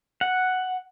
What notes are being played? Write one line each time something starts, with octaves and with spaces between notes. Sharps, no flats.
F#5